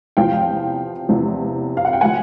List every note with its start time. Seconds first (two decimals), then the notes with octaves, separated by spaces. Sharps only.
0.17 E2 C3 F3 F5 G5
1.09 E2 C3 F3
1.77 F5
1.85 F#5
1.93 G5
2.01 D3 F3 F#5 G#5